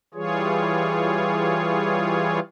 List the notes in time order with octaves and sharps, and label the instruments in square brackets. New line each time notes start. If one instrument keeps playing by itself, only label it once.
[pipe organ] E3 G3 F4 G#4 C#5